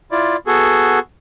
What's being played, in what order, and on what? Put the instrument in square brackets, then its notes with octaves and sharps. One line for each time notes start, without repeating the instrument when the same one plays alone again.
[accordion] E4 F4 D5
B3 F#4 G#4 A4